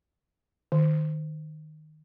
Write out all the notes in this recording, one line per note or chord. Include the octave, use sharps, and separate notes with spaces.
D#3